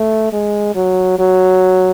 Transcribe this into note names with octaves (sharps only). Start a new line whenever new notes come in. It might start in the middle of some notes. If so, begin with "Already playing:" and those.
Already playing: A3
G#3
F#3
F#3